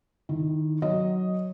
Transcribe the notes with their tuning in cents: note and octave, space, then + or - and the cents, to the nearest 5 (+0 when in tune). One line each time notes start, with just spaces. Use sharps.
D#3 -10 E4 -25
F#3 +0 D#5 +0